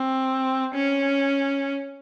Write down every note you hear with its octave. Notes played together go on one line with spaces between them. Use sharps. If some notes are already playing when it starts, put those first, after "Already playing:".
Already playing: C4
C#4